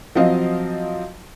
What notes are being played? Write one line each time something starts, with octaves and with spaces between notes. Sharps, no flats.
F3 F#3 C4 D#5 F5